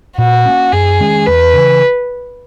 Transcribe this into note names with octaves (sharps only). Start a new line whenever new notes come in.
A#2 F#4
A#3 C#4
F#2 G#4
D#3 G#3 C#4
E2 B4
C#3 E3